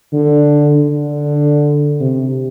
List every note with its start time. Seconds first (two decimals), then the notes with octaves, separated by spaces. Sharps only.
0.13 D3
0.76 D3
2.00 C3